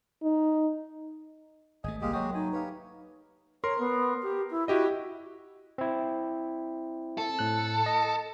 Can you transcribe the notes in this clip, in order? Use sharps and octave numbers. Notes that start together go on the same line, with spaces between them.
D#4
G#1 A3 G#4 D#5 G#5
C2 G3 G#3 A#3 G4 G#4 F5
F#3 G#3 F#4 G#4 C#5 G5
A3 D#4 G#5
G4 B4 C#5 F5
A#4 C#5 C6
B3
G4
E4
E4 F#4 G4 D#5
C4 E4
A4
A2 F#6
D#5